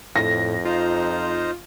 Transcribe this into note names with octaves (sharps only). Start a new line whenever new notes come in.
F2 A2 A#6
D#4 F4 C5 A#5